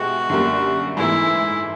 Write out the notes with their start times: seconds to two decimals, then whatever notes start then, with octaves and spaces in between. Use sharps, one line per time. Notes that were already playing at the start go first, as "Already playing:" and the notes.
Already playing: B2 G#3 E4 F#4 G4
0.30 F#2 D3 G3 A#3
0.97 G#2 E3 A3 E4